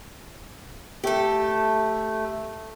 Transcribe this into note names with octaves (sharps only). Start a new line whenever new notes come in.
A3 G4 A4